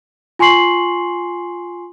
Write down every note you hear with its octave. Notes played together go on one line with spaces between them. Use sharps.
F4 G#5 C6 C#6 C7 F#7